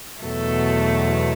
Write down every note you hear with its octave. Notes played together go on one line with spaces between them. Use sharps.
E2 B2 F#3 A3 A4